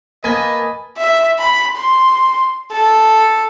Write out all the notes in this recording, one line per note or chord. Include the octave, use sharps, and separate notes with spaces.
A#3 B4 D#5 G#5 A5
E5
B5
C6
A4